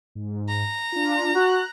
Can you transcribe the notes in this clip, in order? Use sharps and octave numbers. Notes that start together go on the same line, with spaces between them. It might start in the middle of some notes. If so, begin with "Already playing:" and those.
G#2
A#5
D4 F4
F#4 F#6